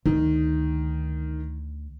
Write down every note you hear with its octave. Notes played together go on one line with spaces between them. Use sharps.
D2 D#3